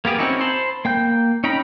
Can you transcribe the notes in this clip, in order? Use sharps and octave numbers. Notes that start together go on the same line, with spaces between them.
A#3 B3 G4 G#4
C4 C#4 D#4 E4 F#4
C5 A5 B5 C6
A#3 G5 G6
C#4 D#4 G5 A#5 B5